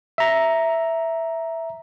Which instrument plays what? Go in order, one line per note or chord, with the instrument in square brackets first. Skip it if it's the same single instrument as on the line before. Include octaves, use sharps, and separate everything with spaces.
[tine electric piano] E5 A#5